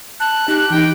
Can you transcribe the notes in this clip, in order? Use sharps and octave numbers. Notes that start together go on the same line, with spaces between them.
A5 F#6
D#4 G4
E3 D#4 G5